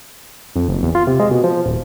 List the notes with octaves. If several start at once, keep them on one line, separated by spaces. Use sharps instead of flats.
F2
F#1
E2
F4
C3
G#3
B2
F3
D#1